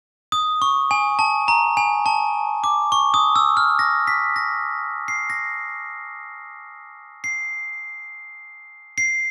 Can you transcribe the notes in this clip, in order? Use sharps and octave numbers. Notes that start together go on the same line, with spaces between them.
D#6
C#6
G#5
A5
A#5
G#5
A5
D6
C#6
D#6
E6
F6
A#6
B6
A#6
C7
A#6
C7
C7